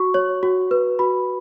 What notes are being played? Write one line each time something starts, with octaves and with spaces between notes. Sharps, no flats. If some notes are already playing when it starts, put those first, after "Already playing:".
Already playing: F#4 C#6
C#5
F#4
B4
F#4 B5